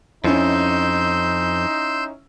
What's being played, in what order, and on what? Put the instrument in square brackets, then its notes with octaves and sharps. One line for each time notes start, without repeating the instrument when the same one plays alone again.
[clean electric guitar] F2 [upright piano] C#4 E4 [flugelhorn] D#4 [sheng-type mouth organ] C6 E6 G6